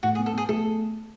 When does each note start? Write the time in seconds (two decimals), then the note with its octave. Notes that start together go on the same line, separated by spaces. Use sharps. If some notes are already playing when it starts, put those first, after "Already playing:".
0.03 A2 F#4
0.15 G#4
0.19 B3
0.26 A4
0.33 B3 G#4
0.49 A3 A4